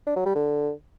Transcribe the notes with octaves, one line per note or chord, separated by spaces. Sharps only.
D4
F#3
G3
D3